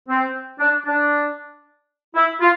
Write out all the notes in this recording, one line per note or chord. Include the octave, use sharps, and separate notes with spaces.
C4
D4
D4
E4
F4